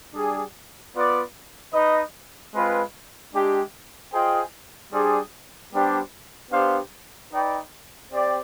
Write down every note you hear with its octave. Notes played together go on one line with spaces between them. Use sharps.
G3 D4 G#4
B3 F4 B4 D5
D#4 B4 D#5
G#3 C4 F4 B4
G#3 D4 G4
F4 G#4 C5 D#5 G5
G3 D4 G#4 C5
G3 B3 D4 G4 C5
B3 D4 G4 C5 F5
D#4 B4 D5 G5
C4 G4 D5